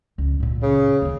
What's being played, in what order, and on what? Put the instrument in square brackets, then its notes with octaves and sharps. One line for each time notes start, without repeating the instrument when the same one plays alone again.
[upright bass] C#2
A#2 F4
[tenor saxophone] C#3
[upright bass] D#2 D#3